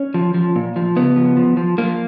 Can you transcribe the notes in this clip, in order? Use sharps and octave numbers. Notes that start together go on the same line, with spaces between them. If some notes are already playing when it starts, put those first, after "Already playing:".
Already playing: C#4
F3
F3
A#2
F3
C#3 B3
F3
F3
F3
F3 A#3